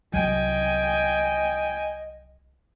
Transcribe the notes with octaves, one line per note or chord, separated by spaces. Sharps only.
C2 F#3 D#5 G5 G#5